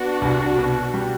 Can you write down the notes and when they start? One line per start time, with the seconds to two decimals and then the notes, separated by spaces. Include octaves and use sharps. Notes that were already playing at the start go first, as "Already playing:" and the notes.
Already playing: B3 D4 F#4
0.22 C2
0.58 B2
0.94 G3